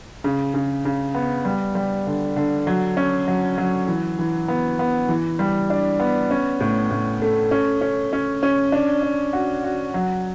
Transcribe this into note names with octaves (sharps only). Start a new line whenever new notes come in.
C#3
C#3
C#3
B3
G3
G3
D3
D3
F#3
C#4
F#3
F#3
E3
E3
B3
B3
E3
G3
D4
B3
C#4
A2
A2
A3
C#4
C#4
C#4
C#4
D4
D4
F#4
F#4
F#3